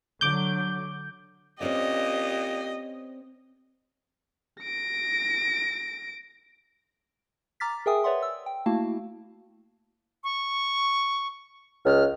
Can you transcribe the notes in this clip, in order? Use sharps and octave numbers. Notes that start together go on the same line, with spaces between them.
D3 F#3 D6 G6
A#2 C4 C#4 G4 D5 D#5
A#6 D7
A#5 D6 F6 A6 B6
G#4 A#4 E5 G5 G#5 D#6
B4 C#5 D5 E5 F#5 C6
E6
G5
A3 A#3 E4 F#4 F5 A5
C#6
C#2 F6